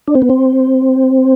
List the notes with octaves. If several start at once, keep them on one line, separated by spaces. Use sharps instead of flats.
D4
C4
B3
C4